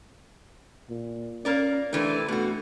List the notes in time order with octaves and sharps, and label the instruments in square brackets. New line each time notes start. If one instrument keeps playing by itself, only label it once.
[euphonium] A#2
[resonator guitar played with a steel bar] A#3 A#4 D5 [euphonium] C#4
[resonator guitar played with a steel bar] C3 E3 A3 [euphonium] D4
[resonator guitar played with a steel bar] B2 F#4 [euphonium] A3